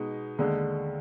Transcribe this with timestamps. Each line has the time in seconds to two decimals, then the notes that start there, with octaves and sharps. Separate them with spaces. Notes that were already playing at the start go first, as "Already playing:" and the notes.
Already playing: B2 G#3 D#4
0.39 D#2 D3 G#3